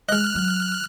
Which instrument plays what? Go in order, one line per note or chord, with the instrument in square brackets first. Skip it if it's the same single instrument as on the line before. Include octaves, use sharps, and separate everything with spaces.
[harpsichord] G#3 D#5 [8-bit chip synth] F6 F#6
[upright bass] F#3